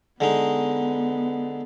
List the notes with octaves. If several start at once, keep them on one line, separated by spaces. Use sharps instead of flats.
D3 G#3 B3 D#4